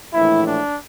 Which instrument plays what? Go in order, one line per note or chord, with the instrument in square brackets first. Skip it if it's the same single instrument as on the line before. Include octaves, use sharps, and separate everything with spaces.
[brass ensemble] A#1 A2 E3 E4
D4